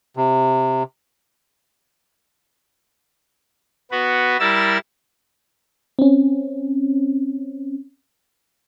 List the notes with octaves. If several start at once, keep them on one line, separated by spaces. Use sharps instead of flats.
C3
B3 F#4 B4
G3 E4 A#4 E6 A6
C4 C#4